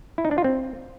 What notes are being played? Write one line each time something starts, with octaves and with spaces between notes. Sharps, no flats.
E4
D#4
D4
F4
C4